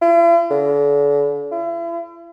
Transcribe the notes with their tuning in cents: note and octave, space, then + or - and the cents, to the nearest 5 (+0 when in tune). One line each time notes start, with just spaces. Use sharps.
E4 +45
D3 -40
E4 +40